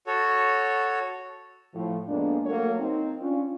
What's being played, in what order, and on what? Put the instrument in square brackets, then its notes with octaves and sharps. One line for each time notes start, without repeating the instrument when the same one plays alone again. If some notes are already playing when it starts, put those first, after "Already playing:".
[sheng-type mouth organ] F#4 A4 C#5
[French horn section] A2 F3
F2 G#3 A#3 B3 D4
F#3 A3 A#3 F#4 A#4 C#5
C4 D#4
C#4 D4 F4